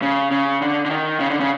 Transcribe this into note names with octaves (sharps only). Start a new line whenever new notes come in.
C#3
C#3
D3
D3
D#3
C#3
D3
C#3